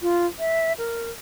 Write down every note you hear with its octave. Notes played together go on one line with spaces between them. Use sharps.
F4
E5
A#4